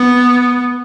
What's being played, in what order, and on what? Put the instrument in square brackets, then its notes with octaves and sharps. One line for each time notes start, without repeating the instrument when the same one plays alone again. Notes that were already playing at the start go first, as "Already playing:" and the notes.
Already playing: [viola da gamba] B3